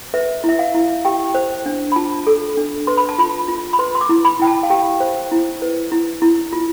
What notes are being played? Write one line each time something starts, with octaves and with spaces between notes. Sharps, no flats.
B4 E5
E4 E5
F5
E4
G4 G5
C5
D4
B5
F4 A5
A4
D4
B4 C6
B5
A5
F4 B5
F4
B5
B4 C6
C6
D6
E4
B5
E4 G5
A5
F5
G4 G5
C5
E4
B4
E4
E4
F4